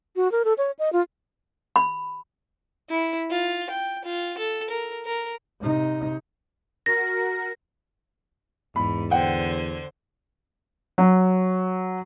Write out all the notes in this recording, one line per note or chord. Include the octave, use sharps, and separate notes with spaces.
F#4
A#4
A4
C#5
D#5
F4
B5
E4
F4
G5
F4
A4
A#4
A#4
C3 D#4
F#4 A#4 A#6
E2 G#2 B5
D3 C5 F#5 G5 G#6
F#3